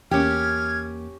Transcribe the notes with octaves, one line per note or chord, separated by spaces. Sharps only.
E2 A#3 C#4 G4 F6 G#6